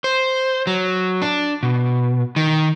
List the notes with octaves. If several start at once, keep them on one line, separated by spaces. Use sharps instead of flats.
C5
F#3
D4
B2
D#3